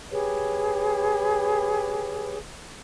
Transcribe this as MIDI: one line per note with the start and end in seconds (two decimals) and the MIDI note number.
0.11 2.37 67
0.11 2.37 68
0.11 2.37 71
0.11 2.37 73